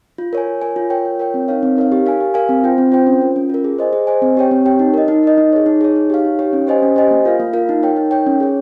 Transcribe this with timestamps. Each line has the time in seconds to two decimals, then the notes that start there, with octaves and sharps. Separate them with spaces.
0.18 F4
0.33 A#4 C#5 G#5
0.47 F4
0.61 A#4 C#5 G#5
0.76 F4
0.90 A#4 C#5 G5
1.05 F4
1.19 A#4 C#5 G5
1.34 C4
1.48 D#4 A#4 C#5 F5
1.63 C4
1.77 D#4 A#4 C#5 F5
1.92 G4
2.06 A#4 F5 G#5
2.20 G4
2.34 A#4 F5 G#5
2.49 C4
2.64 F4 C5 G5
2.78 C4
2.92 F4 C5 G5
3.07 C#4
3.21 F4 A#4
3.36 C#4
3.49 F4 A#4
3.64 G#4
3.79 C5 D#5 G#5
3.93 G#4
4.07 C5 D#5 G#5
4.22 C4
4.37 G4 C#5 G5
4.51 C4
4.66 G4 C#5 G5
4.79 D#4
4.94 A#4 D#5
5.08 D#4
5.23 A#4 D#5
5.38 D#4
5.53 G#4 C#5
5.66 D#4
5.81 G#4 C#5
5.96 D#4
6.10 G4 C#5 F5
6.25 D#4
6.39 G4 C#5 F5
6.53 C#4
6.67 G4 C5 D#5 G#5
6.82 C#4
6.96 G4 C5 D#5 G#5
7.11 A#3
7.25 F4 A#4 F5
7.40 A#3
7.53 F4 A#4 F5
7.69 D#4
7.83 A#4 C#5 G5
7.96 D#4
8.11 A#4 C#5 G5
8.26 C#4
8.40 G#4 C#5